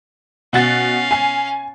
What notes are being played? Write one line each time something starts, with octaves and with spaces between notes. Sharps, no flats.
B2 C#4 F5 F#5 A6
G#5 C7